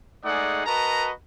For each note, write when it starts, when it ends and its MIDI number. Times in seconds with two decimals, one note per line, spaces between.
0.24 0.63 56
0.24 0.63 57
0.24 0.63 63
0.24 0.63 68
0.24 0.63 74
0.24 0.63 78
0.66 1.10 66
0.66 1.10 70
0.66 1.10 71
0.66 1.10 75
0.66 1.10 81
0.66 1.10 82